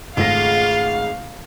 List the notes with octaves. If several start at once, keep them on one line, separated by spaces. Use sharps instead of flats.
G#1 C#3 G#3 A3 F4 F5 A#6